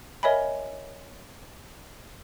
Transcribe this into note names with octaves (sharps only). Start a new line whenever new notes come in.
A#4 C#5 D#5 E5 G#5 B5